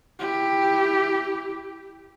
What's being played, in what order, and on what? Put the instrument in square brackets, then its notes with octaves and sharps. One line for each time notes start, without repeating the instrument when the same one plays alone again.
[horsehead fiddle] E4 G4